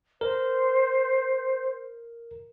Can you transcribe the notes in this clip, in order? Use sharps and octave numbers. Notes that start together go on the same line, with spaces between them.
A#4 C5